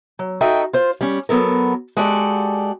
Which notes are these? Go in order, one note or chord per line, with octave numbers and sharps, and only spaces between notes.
F#3
D#4 F#4 A4 D#5 E5 G5
F4 C5
G3 C#4
F#3 B3 A4 A#4
G#3 F#4 G4 A4 D5